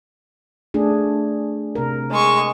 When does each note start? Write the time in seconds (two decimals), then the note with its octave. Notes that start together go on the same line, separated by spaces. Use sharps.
0.74 A3 D4 G#4
1.75 C3 A#4
2.11 G#3 C#6